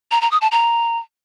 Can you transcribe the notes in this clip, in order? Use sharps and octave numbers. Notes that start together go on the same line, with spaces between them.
A#5
A#5
D#6
A5
A#5